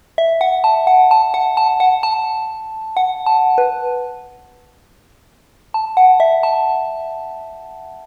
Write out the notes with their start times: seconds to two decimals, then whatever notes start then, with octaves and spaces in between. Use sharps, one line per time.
0.18 E5
0.41 F#5
0.64 A5
0.87 F#5
1.11 A5
1.34 F#5
1.57 A5
1.80 F#5
2.03 A5
2.97 F#5
3.26 A5
3.58 B4
5.74 A5
5.97 F#5
6.20 E5
6.43 A5